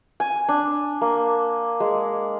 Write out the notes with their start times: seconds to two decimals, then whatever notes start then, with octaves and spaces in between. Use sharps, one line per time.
0.20 G#5
0.48 D4
1.01 A#3
1.80 G#3